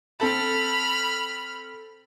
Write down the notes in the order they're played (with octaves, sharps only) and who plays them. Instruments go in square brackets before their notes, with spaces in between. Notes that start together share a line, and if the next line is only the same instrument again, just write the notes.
[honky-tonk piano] C4 A4 A5 [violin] B5 F6